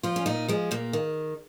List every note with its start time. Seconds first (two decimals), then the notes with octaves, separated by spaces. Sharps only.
0.03 F3 F4
0.16 C#4
0.26 A#2 D#4
0.49 F3 G#3
0.71 A#2 A#3
0.93 D#3